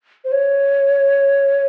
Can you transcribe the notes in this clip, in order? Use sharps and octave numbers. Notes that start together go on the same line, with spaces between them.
C5
C#5